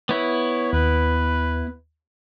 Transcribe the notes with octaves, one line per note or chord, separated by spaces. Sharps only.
B3 E4 C#5
D#2 B4